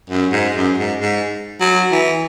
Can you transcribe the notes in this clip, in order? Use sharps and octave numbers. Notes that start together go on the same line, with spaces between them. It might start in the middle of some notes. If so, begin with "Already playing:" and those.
F#2
G#2
F#2
G#2
G#2
F#3
E3